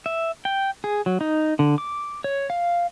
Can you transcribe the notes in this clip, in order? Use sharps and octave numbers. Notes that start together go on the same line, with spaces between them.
E5
G5
G#4
F#3
D#4
D3
D6
C#5
F5